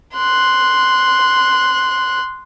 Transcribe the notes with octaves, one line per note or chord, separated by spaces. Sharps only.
C6 F#6